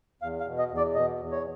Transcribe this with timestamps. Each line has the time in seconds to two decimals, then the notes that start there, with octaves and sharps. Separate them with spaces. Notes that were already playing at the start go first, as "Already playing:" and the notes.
0.22 E2 F5
0.40 F5
0.46 B2
0.59 D#5
0.71 E2
0.77 D5
0.95 B2 D#5
1.20 E2
1.32 C#5